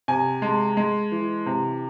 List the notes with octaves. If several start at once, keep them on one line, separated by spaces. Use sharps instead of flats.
C3 G#5
G#3 A5
G#3
E3
C3